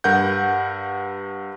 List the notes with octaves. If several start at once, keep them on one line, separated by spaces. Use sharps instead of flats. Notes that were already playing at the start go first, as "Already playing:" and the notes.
G2 A#4 F#5 G6